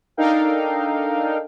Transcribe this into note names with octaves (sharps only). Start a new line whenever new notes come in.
D4 D#4 A4 A#4 F5 G5